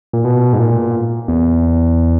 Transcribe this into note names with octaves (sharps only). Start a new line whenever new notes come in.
A#2
B2
G#2
A#2
E2